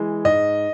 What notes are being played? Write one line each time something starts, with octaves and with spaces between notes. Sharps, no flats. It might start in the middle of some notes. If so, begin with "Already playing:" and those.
Already playing: E3 G#3
G#2 D#5